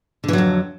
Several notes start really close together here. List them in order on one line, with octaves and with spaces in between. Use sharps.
D3 E3 F#3 F2